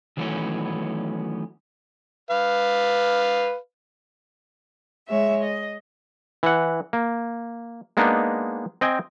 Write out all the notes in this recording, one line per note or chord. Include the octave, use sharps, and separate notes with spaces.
D#3 E3 F#3 A3 B3 C#4
B4 F5
G#3 C#5 E5
D#5
E3 F#5
A#3
G#3 A#3 B3 D4 D#4
C4 D#5 G5 G#5